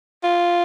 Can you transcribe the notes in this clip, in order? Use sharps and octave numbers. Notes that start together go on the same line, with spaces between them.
F4